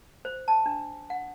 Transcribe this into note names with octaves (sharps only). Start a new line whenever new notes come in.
C5
A5
D4
F#5